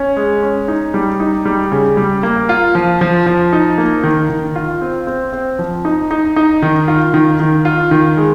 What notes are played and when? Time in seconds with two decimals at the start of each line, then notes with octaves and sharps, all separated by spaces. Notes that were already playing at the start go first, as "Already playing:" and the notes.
Already playing: C#4
0.17 G#3
0.43 C#4
0.68 D#4
0.94 G3
1.20 D#4
1.45 G3
1.72 C#3
1.97 G3
2.23 A#3
2.49 F4
2.75 F3
3.01 F3
3.26 F3
3.53 D#4
3.78 A#3
4.04 D#3
4.30 D#3
4.56 F4
4.81 C4
5.07 C4
5.33 C4
5.59 F3
5.85 D#4
6.11 D#4
6.36 D#4
6.62 D#3
6.88 F4
7.14 D#3
7.40 D#3
7.65 F4
7.91 D#3
8.17 G#3